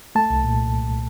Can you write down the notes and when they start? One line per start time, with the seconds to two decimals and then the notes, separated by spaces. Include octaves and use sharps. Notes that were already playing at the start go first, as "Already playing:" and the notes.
0.15 A3 A5
0.30 C2
0.44 A#2